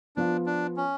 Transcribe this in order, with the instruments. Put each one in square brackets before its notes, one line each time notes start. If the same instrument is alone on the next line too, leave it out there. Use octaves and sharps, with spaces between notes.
[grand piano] F3 B3 F4 [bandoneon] D4
[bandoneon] D4
C#4